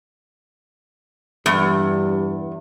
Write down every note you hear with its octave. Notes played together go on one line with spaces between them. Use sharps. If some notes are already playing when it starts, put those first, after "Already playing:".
E2 G2